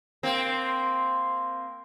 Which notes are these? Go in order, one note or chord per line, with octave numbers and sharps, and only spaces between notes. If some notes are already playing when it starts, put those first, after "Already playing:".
A#3 C4